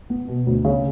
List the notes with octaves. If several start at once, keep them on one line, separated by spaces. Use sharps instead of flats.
B3
B2
D2
C#3